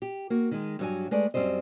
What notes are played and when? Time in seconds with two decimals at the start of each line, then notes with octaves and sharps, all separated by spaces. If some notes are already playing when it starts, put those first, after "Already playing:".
0.02 G4
0.30 A#3 F#4
0.51 D#3 G#3
0.79 G2 F#3 G#5
1.11 G#3 A3 B4 D5
1.34 F#2 B2 G3 C4 C5 D#5